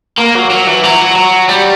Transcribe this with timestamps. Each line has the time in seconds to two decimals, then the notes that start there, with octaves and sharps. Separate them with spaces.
0.18 A#3
0.35 F#3
0.50 F#3
0.67 E3
0.83 F#3
1.16 F#3
1.49 G3